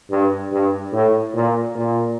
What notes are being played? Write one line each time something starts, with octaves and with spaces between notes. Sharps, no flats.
G2
G2
A2
A#2
A#2